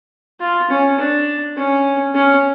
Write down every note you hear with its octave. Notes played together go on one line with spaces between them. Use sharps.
F4
C#4
D4
C#4
C#4